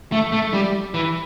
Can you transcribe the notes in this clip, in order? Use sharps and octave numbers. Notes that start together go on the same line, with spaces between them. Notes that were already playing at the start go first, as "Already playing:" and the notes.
A3
A3
G3
E3